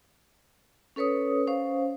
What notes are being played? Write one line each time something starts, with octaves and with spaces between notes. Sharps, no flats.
C#4 A4 B4 C#5 D#6
C#4 C5 F5